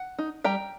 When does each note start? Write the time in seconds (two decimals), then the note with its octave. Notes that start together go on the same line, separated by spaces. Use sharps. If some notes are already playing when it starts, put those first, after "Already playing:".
Already playing: F#5
0.19 D#4
0.44 G3 G5 A#5